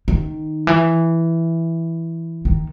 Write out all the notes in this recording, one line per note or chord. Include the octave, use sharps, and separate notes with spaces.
D#3
E3
D#3